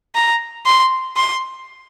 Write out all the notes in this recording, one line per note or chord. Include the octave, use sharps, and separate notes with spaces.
A#5
C6
C6